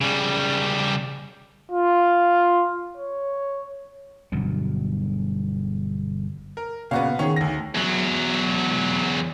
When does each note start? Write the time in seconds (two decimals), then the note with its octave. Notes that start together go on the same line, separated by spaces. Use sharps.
0.01 C#3 G3
1.71 F4
2.97 C#5
4.32 G1 G2 B2 F#3
6.57 A#4
6.91 A#2 C#3 B3 F#4 F5
7.19 D#3 C#4 G#4
7.36 D2 A#6
7.75 E2 F#3